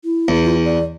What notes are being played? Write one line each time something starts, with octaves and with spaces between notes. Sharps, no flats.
E4
E2
F4
D5